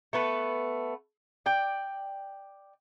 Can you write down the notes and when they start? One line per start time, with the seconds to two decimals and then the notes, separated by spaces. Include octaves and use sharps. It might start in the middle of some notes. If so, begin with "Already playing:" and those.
0.13 A3 B3 B4
1.46 D5 G5